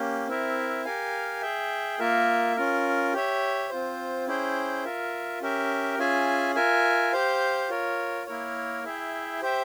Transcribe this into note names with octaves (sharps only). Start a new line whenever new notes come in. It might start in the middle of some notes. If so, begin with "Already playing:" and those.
Already playing: A#3 C#4 G4
C4 E4 A#4 E5
G4 A#4 F5 G#5
G#4 E5 G5
A#3 F4 A#4 E5
C#4 F4 A#4
G4 C#5 E5
C4 F4 C5
C#4 E4 G#4 C5 G5
F4 A#4 E5
C#4 G4 A#4 E5
C#4 F4 G#4 E5 G#5
F4 A#4 E5 G#5
G4 C5 F5
F4 A#4 C#5
A#3 E4 A#4 C#5
E4 G#4 E5 G5
G4 C5 E5 G5